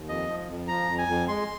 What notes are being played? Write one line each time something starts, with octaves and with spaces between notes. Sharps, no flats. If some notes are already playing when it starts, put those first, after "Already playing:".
Already playing: D#2
F2 D#5
F3
F2
F3 A#5
F2
G#5
F2
G#3 C6